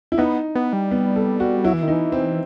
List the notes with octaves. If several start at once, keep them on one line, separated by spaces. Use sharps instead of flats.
E4
B3 D#4
B3
G3
B3
A4
F#4
F#3 E4
E3
D#3
E3 D#4
C4